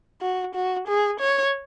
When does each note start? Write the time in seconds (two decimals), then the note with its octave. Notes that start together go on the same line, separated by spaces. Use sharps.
0.21 F#4
0.54 F#4
0.87 G#4
1.20 C#5